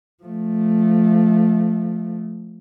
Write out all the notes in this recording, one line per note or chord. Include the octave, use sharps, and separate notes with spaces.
F3 A3